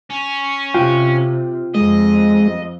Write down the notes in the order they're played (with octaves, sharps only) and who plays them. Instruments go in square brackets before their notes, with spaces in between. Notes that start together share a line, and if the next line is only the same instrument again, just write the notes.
[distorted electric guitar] C#4
[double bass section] C3 [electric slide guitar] F4 G5
[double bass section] F2 [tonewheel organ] G#3 [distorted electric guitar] D#5